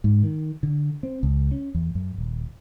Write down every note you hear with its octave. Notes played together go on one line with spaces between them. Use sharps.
G#2
D#3
D3
C4
C#2
C#4
E2
F#2
D#1